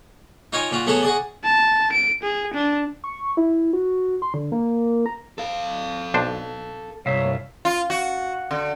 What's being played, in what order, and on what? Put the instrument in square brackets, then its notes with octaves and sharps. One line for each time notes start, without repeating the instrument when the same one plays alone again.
[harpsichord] D#4 F4 C#5 G5 G#5
A#2 F4 F#4
F#3 A3 B3 G#4 A4 C#5
F#4 G#4 D5
[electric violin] A5
D7
G#4
D4
[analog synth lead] C#6
E4
F#4
C6
D3
A#3
A#5
[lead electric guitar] A4 F5
[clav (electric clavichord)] B1 D4 C5
[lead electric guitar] C2 [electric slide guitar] G2 E5 F5 [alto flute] C#5
[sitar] F4
F#4
D3